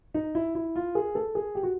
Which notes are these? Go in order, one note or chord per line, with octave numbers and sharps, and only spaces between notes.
D#4
E4
E4
F4
G#4
A4
G#4
G4
F#4